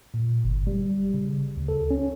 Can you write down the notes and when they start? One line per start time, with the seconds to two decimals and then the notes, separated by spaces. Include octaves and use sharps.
0.14 A#2
0.44 G1
0.67 G3
1.14 C#3
1.57 D2
1.68 A4
1.91 C#4